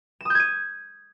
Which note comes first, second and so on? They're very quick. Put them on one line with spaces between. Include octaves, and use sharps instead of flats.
E7 D#6 G6 G#6 D#7